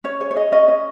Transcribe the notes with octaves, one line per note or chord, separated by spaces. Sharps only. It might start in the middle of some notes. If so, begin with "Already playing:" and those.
C#4 C#5
G#4 C#5
C#5
G#4 D#5
C#4 D#5
C#4 D#5